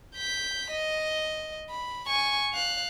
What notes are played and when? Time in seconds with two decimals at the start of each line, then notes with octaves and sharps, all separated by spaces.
0.16 G6 B6
0.71 D#5
1.71 B5
2.07 G#5 C#6
2.53 F5 F#6